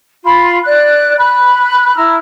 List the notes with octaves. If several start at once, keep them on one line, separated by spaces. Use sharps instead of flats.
F4 B5 C6
D5 F#6
B5 F#6
E4 A#5 E6 F6